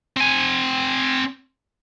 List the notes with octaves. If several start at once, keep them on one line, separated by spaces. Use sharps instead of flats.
C4 G#5